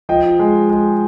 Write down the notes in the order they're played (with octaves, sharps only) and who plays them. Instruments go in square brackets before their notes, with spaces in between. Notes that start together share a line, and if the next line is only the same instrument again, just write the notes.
[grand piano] F3 D#5 G5
G#3
G#3